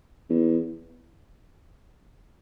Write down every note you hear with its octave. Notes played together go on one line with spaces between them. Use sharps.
E2